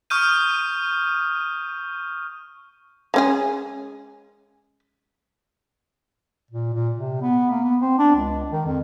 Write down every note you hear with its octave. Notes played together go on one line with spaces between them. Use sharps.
C#6 D#6 F6 G6 D#7
G#3 C#4 G#4
A#2
A#2
C3
B3
A#3
B3
C4
D4
C#2
D#3
F2